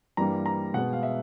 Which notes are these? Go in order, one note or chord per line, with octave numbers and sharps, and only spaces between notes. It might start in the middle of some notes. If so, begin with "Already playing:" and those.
G2 E3 G3 A#3 A#5
A#5
B2 G#3 B3 F#5
F5
E5